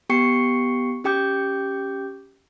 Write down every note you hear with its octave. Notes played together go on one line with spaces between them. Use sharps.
B3 G4 G5 C#6 C7 C#7
C#4 G4 G5 D6 G6